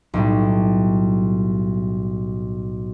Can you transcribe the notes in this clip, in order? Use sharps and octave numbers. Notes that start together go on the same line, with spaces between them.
B1 A2 G3